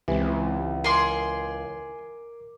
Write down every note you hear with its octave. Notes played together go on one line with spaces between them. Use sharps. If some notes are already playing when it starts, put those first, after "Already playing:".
C#2 E3 G#3 C4 G4
G#4 A#4 C6 D6